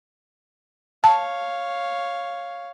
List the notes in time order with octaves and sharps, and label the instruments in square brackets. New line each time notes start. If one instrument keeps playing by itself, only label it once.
[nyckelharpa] C#5 F5 [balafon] A5